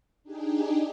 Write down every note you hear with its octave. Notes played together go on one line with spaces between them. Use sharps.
D4 D#4 G4 G#4